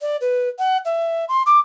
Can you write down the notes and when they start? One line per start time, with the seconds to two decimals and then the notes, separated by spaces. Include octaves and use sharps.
0.01 D5
0.21 B4
0.59 F#5
0.85 E5
1.29 C6
1.46 D6